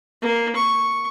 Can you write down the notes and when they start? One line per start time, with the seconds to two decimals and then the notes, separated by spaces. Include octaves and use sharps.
0.22 A#3
0.56 C#6